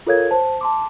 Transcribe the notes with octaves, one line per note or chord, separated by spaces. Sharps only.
F4 A4 A#4 C#5 F5 G#6
C5 A5
A5 C6 D6